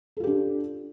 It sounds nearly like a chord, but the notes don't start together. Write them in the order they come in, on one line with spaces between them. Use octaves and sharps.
A4 F4 G4 D4